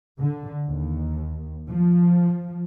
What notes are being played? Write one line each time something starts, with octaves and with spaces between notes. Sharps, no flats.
D3
D#2
F3